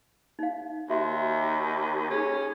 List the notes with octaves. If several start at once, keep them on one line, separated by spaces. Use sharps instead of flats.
D#4 F5
D#2 F#4 E5 C6
C#4 D#4 G#4 A4